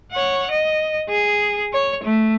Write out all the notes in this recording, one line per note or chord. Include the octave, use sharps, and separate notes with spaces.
C#5 F#5
D#5
G#4
C#5
A3